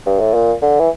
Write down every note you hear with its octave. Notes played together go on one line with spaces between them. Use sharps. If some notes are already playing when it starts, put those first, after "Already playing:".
G2
A2
A#2
D3
E3